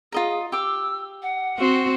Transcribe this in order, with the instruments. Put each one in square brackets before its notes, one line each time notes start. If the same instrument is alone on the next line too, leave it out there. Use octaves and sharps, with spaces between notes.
[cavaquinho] F4 D#5 A#5 [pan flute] G#4
[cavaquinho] G4 D6 [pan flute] E6
[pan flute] F#5
[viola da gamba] C4 F#4